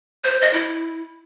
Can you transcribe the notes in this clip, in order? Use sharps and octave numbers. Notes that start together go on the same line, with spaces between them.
C5
D#5
E4